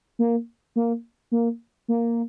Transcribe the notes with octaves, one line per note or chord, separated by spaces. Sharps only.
A#3
A#3
A#3
A#3